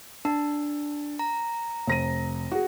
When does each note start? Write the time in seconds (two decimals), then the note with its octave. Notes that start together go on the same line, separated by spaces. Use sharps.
0.25 D4 A5
1.19 A#5
1.87 F1 A#6 D#7
2.52 F#4 G#4